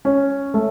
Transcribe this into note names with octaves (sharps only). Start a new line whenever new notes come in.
C#4
A3